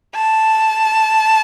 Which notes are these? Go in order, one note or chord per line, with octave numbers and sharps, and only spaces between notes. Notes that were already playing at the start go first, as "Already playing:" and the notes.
A5